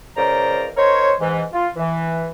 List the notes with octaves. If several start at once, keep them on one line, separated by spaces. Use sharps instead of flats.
C#2 C#3 A#4 C5 D5 A#5
D#4 A#4 C5 C#5
G#2 E3
F4
E3